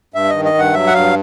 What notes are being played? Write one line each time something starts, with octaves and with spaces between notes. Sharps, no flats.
G2 E5
D#3 D#5
D#5
G2 F#5
F#3 E5
F#5
G2 F5